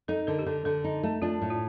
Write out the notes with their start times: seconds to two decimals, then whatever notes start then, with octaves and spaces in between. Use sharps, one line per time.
0.08 D#4 A4
0.27 D3 A#4
0.39 G4
0.46 D3 A4
0.65 D3 A4
0.84 D#4
1.03 A3
1.22 D4 F4
1.42 A2
1.50 F4